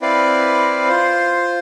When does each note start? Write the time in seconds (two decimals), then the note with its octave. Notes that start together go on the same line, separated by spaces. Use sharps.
0.01 C4 E4 B4 D5 F5
0.89 F4 C5